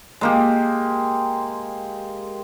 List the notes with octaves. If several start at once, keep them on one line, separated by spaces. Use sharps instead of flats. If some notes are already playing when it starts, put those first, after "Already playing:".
G#3 A#3 G4